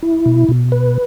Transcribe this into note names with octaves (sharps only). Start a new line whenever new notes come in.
E4
B2
B2
B4